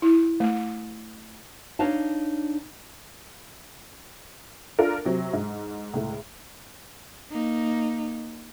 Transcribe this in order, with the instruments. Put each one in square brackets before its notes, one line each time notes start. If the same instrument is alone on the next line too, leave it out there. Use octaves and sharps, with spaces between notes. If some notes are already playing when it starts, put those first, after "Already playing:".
[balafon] E4
A3
[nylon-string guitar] D4 D#4 C#5 F5 A5
[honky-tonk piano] D4 F4 A4 A#4
C3 F#3 C4
G#2
C#2 A2
[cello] A#3 D#4